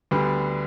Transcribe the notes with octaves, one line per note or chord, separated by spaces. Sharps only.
D2 D3 G3 B3